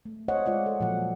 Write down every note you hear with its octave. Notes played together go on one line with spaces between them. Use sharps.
A3
C5 C#5 D#5 F#5
G#3 F4 D5 F#5
A4
A#2 F3 F#3 F#5